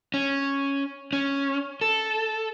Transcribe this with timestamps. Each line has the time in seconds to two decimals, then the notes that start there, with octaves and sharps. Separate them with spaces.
0.14 C#4
1.13 C#4
1.81 A4